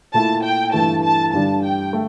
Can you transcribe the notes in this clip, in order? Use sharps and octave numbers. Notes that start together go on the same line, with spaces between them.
A#2 A3 E4 A5
G5
G2 E3 A3 A5
A5
G2 D3 G3 D4 A5
G5
A3